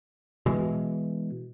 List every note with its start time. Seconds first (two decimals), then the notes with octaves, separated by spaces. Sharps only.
0.46 B2 E3 G#3